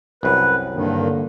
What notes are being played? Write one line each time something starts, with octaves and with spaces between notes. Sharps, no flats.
C2 F#2 B4
G2 D3 D#3 A#3